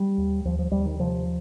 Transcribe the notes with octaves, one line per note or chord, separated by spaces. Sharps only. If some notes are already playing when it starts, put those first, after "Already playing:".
Already playing: G3
D#2
D#2 F3
F3
D#2 G3
D#3
C3 F3